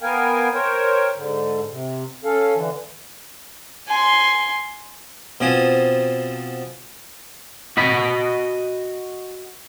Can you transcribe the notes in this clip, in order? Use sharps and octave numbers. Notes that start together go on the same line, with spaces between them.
B3 A#4 F5 G5 G#5
A#4 C5 C#5 G5
G#2 D3
C3
C#4 A4 F5
D3 E3
G#5 C6
B2 F3 C4 G#5 A5
F#4 D#5 B5